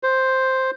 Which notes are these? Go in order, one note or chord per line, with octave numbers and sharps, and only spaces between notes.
C5